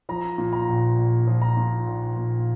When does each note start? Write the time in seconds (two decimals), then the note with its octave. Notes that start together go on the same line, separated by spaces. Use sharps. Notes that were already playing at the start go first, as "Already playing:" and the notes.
0.09 F3 A#5
0.38 A#2
0.53 A#5
0.68 A#1
0.97 A#1
1.27 F3
1.42 A#5
1.57 A#2
1.87 A#1
2.16 A#1